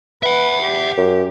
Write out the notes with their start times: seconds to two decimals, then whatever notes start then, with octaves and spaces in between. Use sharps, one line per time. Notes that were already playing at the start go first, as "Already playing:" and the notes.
0.23 B4 E5 F#5
0.62 G4
0.97 F#2